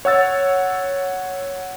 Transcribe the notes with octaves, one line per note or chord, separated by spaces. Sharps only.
C#5 F#5 E6 A6